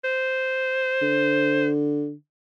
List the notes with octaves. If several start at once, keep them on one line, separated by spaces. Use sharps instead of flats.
C5
D3